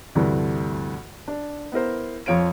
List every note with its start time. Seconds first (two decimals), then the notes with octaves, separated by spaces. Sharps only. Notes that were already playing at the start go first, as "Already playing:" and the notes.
0.15 D2 G2 C3 E3 A3
1.28 D4
1.72 B3 E4 A#4 C5
2.26 F2 F3 C#5 F5 D7